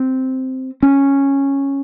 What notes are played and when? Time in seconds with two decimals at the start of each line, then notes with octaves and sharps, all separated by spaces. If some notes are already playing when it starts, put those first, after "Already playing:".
Already playing: C4
0.83 C#4